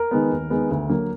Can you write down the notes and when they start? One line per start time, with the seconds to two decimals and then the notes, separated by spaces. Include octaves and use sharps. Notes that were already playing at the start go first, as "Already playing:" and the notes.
Already playing: A#4
0.11 D#3 G#3 B3
0.31 D#2
0.50 D#3 G#3 B3
0.70 D2
0.89 D3 F#3 A#3